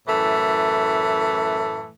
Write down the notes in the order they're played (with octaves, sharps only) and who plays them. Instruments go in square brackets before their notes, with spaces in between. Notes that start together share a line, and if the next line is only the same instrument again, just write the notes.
[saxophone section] F#2 A2 E3 A3